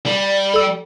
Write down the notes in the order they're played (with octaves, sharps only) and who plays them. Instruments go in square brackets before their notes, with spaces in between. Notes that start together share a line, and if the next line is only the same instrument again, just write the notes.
[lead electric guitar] G3
[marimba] A4 E6